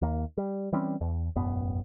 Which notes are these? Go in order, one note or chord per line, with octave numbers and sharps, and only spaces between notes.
D#2 A#3
G3
E3 G3 C4 C#4
E2
E1 A1 F#2 B3